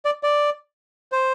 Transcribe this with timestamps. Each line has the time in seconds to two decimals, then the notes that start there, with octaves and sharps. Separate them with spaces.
0.05 D5
0.23 D5
1.12 C5